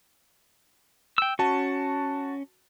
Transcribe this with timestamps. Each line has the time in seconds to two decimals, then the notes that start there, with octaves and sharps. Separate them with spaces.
1.18 G5 E6
1.39 C#4 F#4 A5